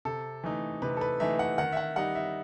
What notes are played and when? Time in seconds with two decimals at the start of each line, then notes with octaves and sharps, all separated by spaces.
0.05 C3 A4
0.44 E3 A3 D#4
0.82 C3 B4
0.97 A4
1.01 B4
1.20 E3 A3 D#4 E5
1.39 F#5
1.58 D#3 F#5
1.72 E5
1.77 F#5
1.96 G3 D#4 F#5
2.15 E5